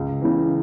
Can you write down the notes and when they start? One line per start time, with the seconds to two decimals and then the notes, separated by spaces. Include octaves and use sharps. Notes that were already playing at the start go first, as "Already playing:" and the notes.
Already playing: C#2
0.21 C#3 E3